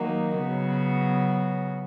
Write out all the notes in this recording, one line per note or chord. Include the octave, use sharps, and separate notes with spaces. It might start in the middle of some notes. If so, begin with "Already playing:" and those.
Already playing: D#3 F#3 A#3 D#4 F#4
C#3 F#3 B3 F#4